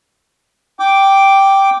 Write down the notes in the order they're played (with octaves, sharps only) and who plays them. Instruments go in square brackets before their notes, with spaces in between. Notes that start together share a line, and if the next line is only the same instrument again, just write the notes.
[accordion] G5 D6